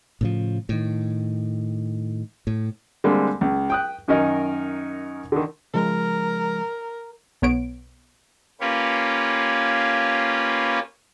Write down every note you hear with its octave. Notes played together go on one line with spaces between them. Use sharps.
A2 C#3 F3
A2 D#3
A2
D3 G3 G#3 A#3 C4
C#2
G5 D#6 F#6
F#2 D#3 C#4 D#4 A#4 D#5
D3 D#3
C#3 F3 G#3 A#4
B1 B3 C#5 D7
A#3 C#4 F4 G4 B4 C#5